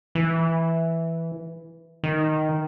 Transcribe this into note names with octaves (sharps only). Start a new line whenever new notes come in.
E3
D#3